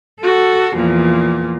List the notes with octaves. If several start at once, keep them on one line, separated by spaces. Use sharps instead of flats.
F#4 A4
E2 A#2 F3